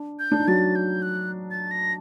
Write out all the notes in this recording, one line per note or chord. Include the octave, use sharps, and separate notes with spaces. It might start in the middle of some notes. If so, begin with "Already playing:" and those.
Already playing: D4
G6
D4
D#4
F#3 F#4 A6
G6
F#6
A6
A#6